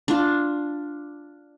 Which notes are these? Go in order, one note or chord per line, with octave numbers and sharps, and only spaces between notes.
D4 F4